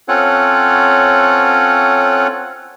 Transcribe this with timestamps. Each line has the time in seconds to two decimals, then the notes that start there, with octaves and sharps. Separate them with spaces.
0.08 C4 C#4 F4 A4 C#5 F#5